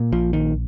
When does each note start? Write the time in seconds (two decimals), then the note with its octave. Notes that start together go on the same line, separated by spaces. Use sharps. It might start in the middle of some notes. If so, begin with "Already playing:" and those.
Already playing: A#2
0.12 A#1 F3
0.33 D#3